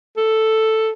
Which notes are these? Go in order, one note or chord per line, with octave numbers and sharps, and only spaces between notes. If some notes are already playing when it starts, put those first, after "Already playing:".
A4